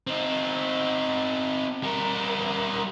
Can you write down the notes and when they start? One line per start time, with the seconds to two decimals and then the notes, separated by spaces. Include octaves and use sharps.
0.07 C4 D#4
1.83 G3 A#4